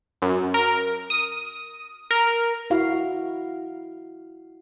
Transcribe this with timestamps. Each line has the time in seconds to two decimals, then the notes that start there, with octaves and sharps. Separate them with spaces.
0.22 F#2
0.54 A#4
1.10 D#6
2.11 A#4
2.70 E4 F#4 F5